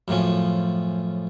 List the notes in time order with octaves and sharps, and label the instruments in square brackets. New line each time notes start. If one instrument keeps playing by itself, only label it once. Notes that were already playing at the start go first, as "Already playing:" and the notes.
[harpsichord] F#2 A2 F3 C#4